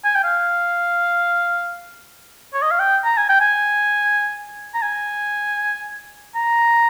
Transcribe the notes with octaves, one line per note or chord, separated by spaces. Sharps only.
G#5
G5
F5
C#5
D#5
F5
G5
A#5
G#5
G5
G#5
A#5
G#5
A#5